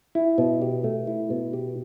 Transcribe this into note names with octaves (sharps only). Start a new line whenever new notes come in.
E4
B2
G4
A3
E4
B2
G4